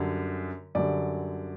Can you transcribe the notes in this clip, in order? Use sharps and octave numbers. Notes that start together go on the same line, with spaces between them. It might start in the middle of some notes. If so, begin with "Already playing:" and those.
Already playing: F#2 D3 G3
F#2 D3 G3 D5